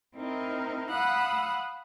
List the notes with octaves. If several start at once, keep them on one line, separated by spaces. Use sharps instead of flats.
C4 D#4 E4 A#4
F5 F#5 B5 D#6 E6 F#6